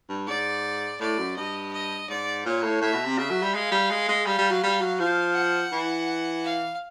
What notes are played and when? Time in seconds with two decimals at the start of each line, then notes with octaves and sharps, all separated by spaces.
0.09 G2
0.27 G#2 D5
1.00 A2 D5
1.19 F#2
1.36 G2 D#5
1.73 D#5
2.09 G#2 D5
2.46 A#2 C#5
2.63 A2
2.81 A2 E5
2.94 B2
3.05 C3
3.18 C#3 E5
3.31 F#3
3.42 G3
3.54 G#3 F5
3.72 G3
3.90 G#3
4.09 G#3
4.26 G3 F5
4.38 G3
4.51 F#3
4.63 G3
4.81 F#3
4.99 F3 F5
5.36 F#5
5.72 E3
6.44 F5